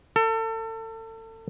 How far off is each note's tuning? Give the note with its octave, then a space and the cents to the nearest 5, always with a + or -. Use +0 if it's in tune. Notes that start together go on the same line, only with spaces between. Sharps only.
A4 +30